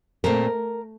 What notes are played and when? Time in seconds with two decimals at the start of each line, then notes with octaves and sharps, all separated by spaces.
0.24 A#2 A3 C4 A#4